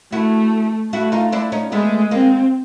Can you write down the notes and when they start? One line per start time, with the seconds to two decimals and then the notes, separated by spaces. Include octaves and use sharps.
0.12 A3 E4 F#4
0.92 A3 E4 F#4
1.12 D#4 F4
1.32 D4 E4
1.52 C#4 D#4
1.72 G#3 A3 B3
2.11 G#3 A#3 C4